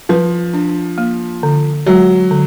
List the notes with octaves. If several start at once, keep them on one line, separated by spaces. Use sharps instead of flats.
F3 B4
D4
A#3
D3
F#3 G#3
D3